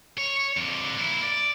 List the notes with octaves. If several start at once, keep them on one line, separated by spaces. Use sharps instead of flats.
C#5
F2 D3
A#3 E4
D5